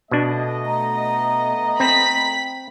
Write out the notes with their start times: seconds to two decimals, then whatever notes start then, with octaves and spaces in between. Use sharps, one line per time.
0.11 B2 A3 B3 D4 D#5
0.66 A#5
1.80 C4 B5 B6